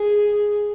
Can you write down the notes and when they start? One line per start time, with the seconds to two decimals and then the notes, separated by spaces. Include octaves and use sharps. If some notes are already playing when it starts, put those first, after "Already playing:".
Already playing: G#4